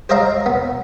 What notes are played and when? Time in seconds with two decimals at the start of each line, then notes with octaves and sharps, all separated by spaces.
0.09 C5 C#5 D#5 F5 A#5 C6
0.46 B3